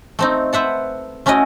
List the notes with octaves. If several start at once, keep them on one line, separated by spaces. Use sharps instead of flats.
A3 C4 D#4
B4 C5 E5 F#5 A5
A3 C#4 E4 F#4 D#5